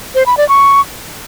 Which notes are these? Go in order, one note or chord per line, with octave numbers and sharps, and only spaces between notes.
C5
B5
D5
C#6